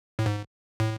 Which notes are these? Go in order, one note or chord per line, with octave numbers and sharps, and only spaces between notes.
A2
G#2
A2